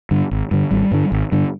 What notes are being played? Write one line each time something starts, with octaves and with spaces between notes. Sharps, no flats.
G2 D3
G#1
G2 D3
G#1 G3
G2 D3
G#1
G2 D3